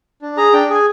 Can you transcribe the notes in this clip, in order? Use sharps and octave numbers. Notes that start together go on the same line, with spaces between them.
D4
G#4 A#5
D4 G5
G#4 G#5